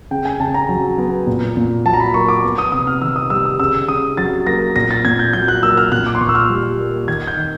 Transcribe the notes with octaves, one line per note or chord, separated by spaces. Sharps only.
C#3 G5
G#5
C#3 A5
A#5
F#3
B3
A#2
A#2
F#3 A5
A#5
B5
A#3 C#6
D6
B3
D#6
C3 D#6
F6
D#3 E6
D#6
G3 E6
D#6
C#3 E6
C#3 D#6
F#3 A6
A#3 A#6
A#2 A#6
A6
A#2 G#6
G6
F#3 G6
F#6
A#3 E6
F6
A#2 F#6
D6
C6
A#2 C#6
E6
F6
G3
A#3
D#3 G#6
G6
D#3